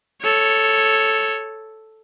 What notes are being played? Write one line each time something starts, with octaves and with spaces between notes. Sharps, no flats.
A4 C#5